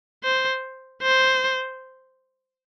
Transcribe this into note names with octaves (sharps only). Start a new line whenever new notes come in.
C5
C5